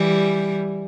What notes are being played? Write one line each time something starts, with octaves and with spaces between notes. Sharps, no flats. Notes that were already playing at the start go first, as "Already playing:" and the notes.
Already playing: E3 G3